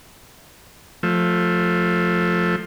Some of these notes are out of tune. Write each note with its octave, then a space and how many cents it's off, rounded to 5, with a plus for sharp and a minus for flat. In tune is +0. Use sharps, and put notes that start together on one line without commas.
F3 +15 A3 +0